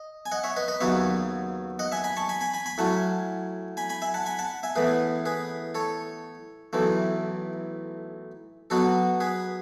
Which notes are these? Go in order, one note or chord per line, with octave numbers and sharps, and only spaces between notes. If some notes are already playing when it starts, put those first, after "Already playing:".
Already playing: D#5
G#5
D#5 F#5
C#5 E5
B4 D#5
B4 D#5
D#2 C#3 F#3 B3 C#5 E5
D#5 F#5
E5 G#5
G#5 B5
A5 C#6
G#5 B5
G#5 B5
G#5 B5
G#5 B5
A2 F#3 C#4 F#5 A5
G#5 B5
G#5 B5
E5 G#5
F#5 A5
G#5 B5
F#5 A5
E5 G#5
A2 E3 B3 G#4 B4
G#4 B4
A4 C#5
B1 A2 E3 A3
B2 F#3 B3 F#4 A4
G#4 B4